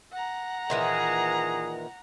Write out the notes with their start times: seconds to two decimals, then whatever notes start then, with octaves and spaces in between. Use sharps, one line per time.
0.12 F#5 A#5
0.70 A#2 D#3 E3 G#4